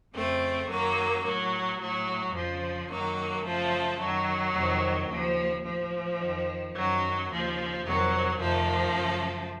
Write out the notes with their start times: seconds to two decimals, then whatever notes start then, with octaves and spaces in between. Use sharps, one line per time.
0.14 F2 C#3 A3 C4
0.70 F#2 D#3 F#3 A#3
1.25 A2 F#3
1.80 A2 F#3
2.34 F2 C#3 F3
2.89 F#2 D#3 F#3 A#3
3.44 F#2 C#3 F3 A3
4.00 F#2 D#3 F#3
4.55 F2 C3 D#3
5.09 D#2 C#3 F3
5.65 A2 F3
6.20 F2 D#3
6.74 F#2 D#3 F#3
7.29 D#2 C#3 F3
7.85 F2 C3 D#3 F#3
8.39 F2 C3 D#3 F3 A3
8.94 F#2 C#3